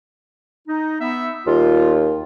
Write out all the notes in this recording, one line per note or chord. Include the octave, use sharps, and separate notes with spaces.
D#4
B3 E5
D#2 F4